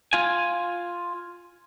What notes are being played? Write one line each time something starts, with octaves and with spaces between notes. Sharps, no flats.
F4 G#5